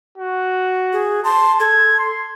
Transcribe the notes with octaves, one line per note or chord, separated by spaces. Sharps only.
F#4
G#4
A5 C6
A4 G#6
C6